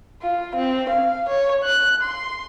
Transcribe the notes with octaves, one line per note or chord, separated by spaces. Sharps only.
F4
C4
F5
C#5
F#6
C6